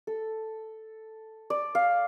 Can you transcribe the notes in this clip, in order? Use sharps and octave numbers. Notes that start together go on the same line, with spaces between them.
A4
D5
F5